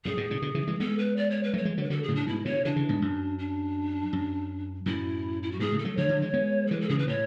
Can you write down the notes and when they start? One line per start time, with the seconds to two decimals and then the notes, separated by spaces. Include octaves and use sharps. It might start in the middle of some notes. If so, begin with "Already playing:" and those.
0.05 F#2 A2 G#4
0.17 G#2 B2
0.30 A2 C#3
0.42 B2 D3
0.55 C#3 E3
0.67 E3 G#3
0.80 G#3 B3 A4
0.98 B4
1.16 D5
1.30 C#5
1.43 B4
1.53 F#3 A3 C#5
1.65 E3 G#3
1.77 D3 F#3
1.83 B4
1.90 D3 F#3 A4
2.03 G#4
2.08 A2 C#3
2.15 D4
2.27 G#2 B2 E4
2.45 B2 D3 C#5
2.65 C#3 E3 D4
2.76 C#3 E3
2.89 G#2 B2
3.02 F#2
3.38 D4
4.13 F#2
4.86 F#2 A2 E4
5.42 E4
5.51 F#4
5.60 G#2 B2 G#4
5.72 A2 C#3
5.78 A4
5.85 F#3 A3
5.97 D3 F#3 C#5
6.09 D3 F#3
6.22 E3 G#3
6.33 G#3 B3
6.67 A4
6.71 E3 G#3 B4
6.80 A4
6.89 C#3 E3 G#4
6.98 B4
7.07 A2 C#5